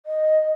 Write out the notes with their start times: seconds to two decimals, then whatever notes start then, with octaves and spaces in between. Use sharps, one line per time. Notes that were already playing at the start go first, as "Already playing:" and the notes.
0.06 D#5